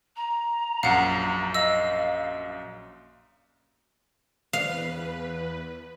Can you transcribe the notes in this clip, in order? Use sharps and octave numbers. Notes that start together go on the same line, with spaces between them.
A#5
A#1 F#2 F5 F#5
D#5 F5 E6
E2 B4 F5